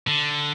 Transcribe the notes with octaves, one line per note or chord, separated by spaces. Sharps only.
D3